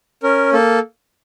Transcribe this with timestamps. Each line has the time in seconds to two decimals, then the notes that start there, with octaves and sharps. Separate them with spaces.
0.23 C#4 A#4
0.52 A#3 A4